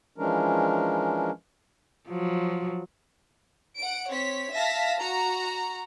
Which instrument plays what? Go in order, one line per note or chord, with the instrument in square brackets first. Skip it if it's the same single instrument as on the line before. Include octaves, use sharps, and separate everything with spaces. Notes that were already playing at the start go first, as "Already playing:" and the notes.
[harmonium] E3 F3 G#3 C#4 D4 A#4
[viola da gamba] F3 F#3
[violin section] F#5 D7
C4 C#5 B6
E5 F5 A5 A#6 B6
F#4 A#5